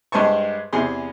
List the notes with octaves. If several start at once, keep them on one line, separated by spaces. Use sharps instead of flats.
G2 G#3 C5 G#5 A5 C#6
E2 C3 G#4 C6